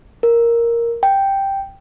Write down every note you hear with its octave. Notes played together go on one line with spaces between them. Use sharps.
A#4
G5